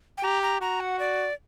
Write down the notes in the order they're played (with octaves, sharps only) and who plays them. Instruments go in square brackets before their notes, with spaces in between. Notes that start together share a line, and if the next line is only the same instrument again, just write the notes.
[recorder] G5
[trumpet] G4 [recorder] A#5
[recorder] A#5
[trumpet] F#4 [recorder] A#5
[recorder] F#5
D5